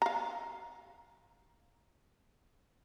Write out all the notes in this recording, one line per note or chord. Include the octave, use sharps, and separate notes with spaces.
F5 A#5